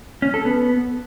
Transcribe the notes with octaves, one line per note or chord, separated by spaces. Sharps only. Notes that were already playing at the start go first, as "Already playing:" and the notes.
C#4
A4
B3